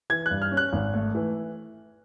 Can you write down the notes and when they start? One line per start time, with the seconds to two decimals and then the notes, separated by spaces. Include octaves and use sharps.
0.10 E3 G#6
0.26 G2 F#6
0.42 F6
0.52 C#4
0.57 F#6
0.73 G#1
0.94 A3
1.15 E3